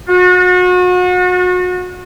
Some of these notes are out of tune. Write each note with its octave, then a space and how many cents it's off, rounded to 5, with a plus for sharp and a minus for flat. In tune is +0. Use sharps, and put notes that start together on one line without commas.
F#4 -35